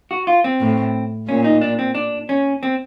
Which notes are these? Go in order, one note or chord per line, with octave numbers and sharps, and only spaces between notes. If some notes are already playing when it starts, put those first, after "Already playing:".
F#4
F4
C4
A2
A#2 C#4
D#4
D4
C4
D4
C#4
C4